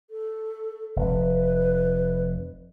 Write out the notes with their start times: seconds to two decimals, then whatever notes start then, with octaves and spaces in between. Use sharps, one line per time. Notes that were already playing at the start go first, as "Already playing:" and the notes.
0.10 A4
0.96 F1 B4